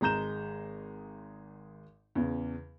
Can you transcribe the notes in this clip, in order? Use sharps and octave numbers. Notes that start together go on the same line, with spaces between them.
G#1 G#3 A#5 G6 E7
E2 C#3